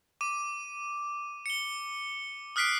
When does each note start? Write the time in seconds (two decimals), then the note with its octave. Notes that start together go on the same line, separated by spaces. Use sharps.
0.21 D6 D#7
1.46 C#7 G7
2.56 D#6 F6 F#6 B6 C7 D7